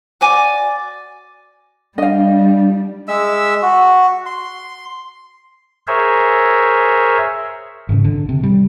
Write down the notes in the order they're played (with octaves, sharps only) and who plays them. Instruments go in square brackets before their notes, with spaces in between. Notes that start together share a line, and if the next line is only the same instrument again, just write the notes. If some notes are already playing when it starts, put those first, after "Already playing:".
[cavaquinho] F#4 D5 G#5 D6
[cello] G3 [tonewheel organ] D4 [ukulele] D#5 F5
[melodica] G#3 E5 E6
F#4
C6
[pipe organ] G#4 A#4 C5 C#5 E5
[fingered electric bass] G#1 C#3
D3
C3
G3